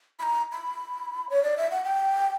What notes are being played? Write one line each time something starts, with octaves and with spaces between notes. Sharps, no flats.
B5
A#5
B5
C#5
D5
E5
F#5
G5